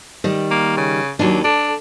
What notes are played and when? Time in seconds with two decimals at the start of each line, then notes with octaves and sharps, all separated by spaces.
0.24 D#3 G3
0.51 A#3
0.77 C#3
1.19 D#2 F#3 D4
1.44 D4 A4